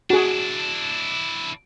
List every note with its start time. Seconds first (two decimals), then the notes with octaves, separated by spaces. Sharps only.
0.10 D4 E4 F#4 G#4